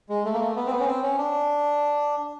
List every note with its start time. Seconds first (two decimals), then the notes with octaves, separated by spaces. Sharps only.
0.09 G#3
0.25 A3
0.34 A#3
0.40 A3
0.56 B3
0.67 C4
0.71 B3
0.80 C#4
0.86 C4
1.02 C#4
1.18 D4